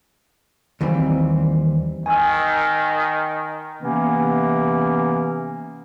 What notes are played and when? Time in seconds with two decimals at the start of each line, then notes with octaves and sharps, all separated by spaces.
0.81 D#2 E3 G3 C4
2.06 D#3 G#5 E6
3.81 C3 E3 A#3 B3 C#4